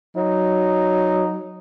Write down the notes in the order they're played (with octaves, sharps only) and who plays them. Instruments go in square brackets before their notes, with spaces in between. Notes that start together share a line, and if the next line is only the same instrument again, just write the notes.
[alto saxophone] F#3 [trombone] D#4